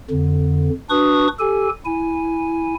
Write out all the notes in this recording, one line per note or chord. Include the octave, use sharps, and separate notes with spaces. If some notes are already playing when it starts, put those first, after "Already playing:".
F2 D3
D4 F#4 B4 C#6 D#6
G4 A4 G#5
E4 G#5